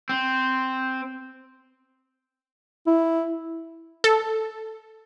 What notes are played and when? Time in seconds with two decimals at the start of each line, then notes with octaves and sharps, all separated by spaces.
0.09 C4
2.87 E4
4.04 A4